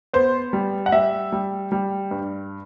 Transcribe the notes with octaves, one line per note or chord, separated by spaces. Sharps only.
B3 C5
G3
F#5
G3 E5
G3
G3
G2